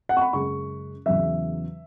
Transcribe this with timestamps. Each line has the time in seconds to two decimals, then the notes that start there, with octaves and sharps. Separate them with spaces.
0.09 F#5
0.17 C#6
0.21 B5
0.33 F#2 C#3 G#3 C#6
1.06 E2 C#3 F#3 E5